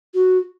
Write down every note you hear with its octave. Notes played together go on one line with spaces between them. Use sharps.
F#4